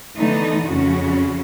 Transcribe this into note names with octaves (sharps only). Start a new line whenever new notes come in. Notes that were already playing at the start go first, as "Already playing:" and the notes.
D3 E3 A3 B3 D#4
F2 C#3 C#4 F#4